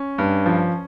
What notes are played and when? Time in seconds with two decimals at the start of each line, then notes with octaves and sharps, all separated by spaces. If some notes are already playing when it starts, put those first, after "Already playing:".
Already playing: C#4
0.18 G2
0.46 F3